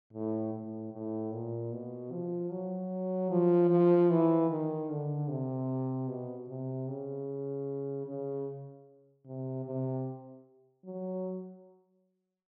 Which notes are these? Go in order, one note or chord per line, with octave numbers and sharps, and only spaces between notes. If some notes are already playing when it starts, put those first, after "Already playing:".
A2
A2
A2
A#2
B2
F3
F#3
F3
F3
E3
D#3
D3
C3
B2
C3
C#3
C#3
C3
C3
F#3